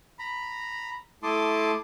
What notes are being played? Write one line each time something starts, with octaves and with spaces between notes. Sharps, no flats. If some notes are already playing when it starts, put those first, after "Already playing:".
A#5 B5
A3 E4 A5 C6 D6 D#6